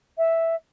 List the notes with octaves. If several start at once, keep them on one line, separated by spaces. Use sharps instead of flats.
E5